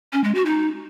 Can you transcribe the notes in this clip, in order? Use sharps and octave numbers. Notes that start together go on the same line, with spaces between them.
C#4
G#3
F#4
D#4